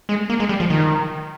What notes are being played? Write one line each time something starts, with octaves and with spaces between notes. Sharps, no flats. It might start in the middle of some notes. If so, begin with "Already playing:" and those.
G#3
A#3
G#3
G3
F3
D#3